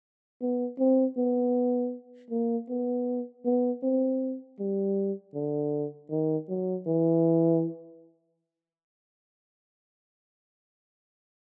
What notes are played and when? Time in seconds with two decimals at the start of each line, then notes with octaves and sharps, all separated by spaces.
0.41 B3
0.79 C4
1.17 B3
2.31 A#3
2.69 B3
3.45 B3
3.83 C4
4.59 G3
5.34 D3
6.10 D#3
6.49 F#3
6.87 E3